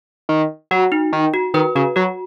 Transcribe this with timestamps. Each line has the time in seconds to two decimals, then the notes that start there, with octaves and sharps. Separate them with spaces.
0.29 D#3
0.71 F#3 F#4
0.92 D#4
1.13 D#3
1.34 F#4
1.54 D#3 B4
1.75 C#3 F#4
1.96 F#3 F#4